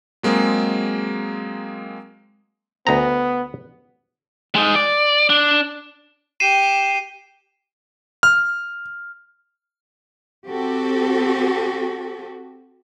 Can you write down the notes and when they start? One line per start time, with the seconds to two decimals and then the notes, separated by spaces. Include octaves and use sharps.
0.23 F#3 G#3 A#3 C4 G#4
2.87 D2 B3 A#5
4.55 G#3 D#4
4.75 D5
5.30 D4
6.40 G4 C7 D#7 E7
8.23 F6
10.47 C4 F#4 G4 A4